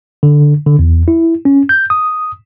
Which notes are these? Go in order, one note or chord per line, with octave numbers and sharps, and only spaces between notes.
D3
D3
E2
E4
C#4
G6
D#6